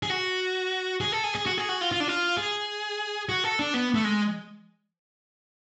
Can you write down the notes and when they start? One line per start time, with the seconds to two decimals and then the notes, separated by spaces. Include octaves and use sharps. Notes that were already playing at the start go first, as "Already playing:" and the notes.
0.03 G#4
0.10 F#4
1.01 G#4
1.12 A4
1.24 G#4
1.35 G#4
1.46 F#4
1.58 G#4
1.69 F#4
1.81 F4
1.92 F4
2.00 D4
2.08 F4
2.37 G#4
3.29 F#4
3.44 A4
3.59 D4
3.74 B3
3.94 A3
4.04 G#3